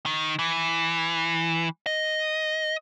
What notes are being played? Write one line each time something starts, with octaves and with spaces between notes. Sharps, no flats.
D#3
E3
D#5